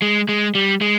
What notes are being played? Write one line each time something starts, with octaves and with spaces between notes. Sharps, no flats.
G#3
G#3
G3
G#3